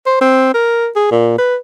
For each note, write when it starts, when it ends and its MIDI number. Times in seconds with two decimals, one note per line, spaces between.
0.06 0.17 72
0.21 0.52 60
0.54 0.88 70
0.96 1.10 68
1.11 1.34 46
1.38 1.56 71